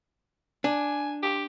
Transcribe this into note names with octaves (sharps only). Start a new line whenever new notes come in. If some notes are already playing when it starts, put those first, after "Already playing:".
D4 G#5
G4